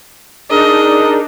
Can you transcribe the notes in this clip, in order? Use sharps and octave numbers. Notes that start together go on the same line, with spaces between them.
D4 D#4 G#4 A#4 D#5